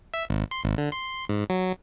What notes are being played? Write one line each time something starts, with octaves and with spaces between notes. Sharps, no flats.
E5
G#1
C6
G#1
D3
C6
G#2
F#3